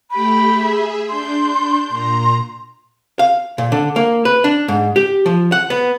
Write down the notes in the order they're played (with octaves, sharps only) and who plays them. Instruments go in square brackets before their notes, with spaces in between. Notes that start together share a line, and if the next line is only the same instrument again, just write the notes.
[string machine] A3 G4 G5 [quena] B5
[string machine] G#4 E5
[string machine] D4 G6 [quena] C6
[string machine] A#2 A#5 [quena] C6
[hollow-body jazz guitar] F5
A#2
D3
A#3
B4
D4
G#2
G4
F3
F#5
B3